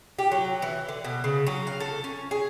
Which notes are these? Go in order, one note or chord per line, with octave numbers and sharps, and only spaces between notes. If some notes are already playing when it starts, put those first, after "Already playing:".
G4
F#3
E3
D3
B2
C#3
F#3
F5
A4
C#4
G#4